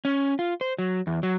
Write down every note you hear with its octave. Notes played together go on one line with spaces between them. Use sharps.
C#4
F4
C5
F#3
E2
F#3